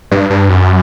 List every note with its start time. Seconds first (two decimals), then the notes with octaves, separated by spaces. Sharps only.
0.11 G2
0.30 G2
0.49 F#2